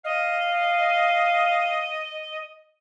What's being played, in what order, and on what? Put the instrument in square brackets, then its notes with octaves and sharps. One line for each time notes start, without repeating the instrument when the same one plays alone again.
[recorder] D#5 [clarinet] F5